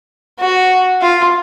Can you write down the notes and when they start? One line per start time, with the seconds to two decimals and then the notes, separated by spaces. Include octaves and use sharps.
0.39 F#4
1.01 F4